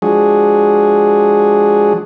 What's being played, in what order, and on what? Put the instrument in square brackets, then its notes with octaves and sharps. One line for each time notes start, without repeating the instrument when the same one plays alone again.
[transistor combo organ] F3 G#3 D4 F#4 G#4